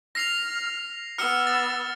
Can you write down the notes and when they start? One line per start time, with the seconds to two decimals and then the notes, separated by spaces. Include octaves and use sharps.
0.15 F6 A#6 C7 F7
1.18 B3 E6 F6 C#7 G7
1.47 A6